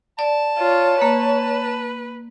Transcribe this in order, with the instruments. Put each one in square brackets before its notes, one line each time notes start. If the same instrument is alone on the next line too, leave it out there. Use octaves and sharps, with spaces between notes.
[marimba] D5 [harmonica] A5
[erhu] F4 [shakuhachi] C#5
[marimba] A#3 [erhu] B4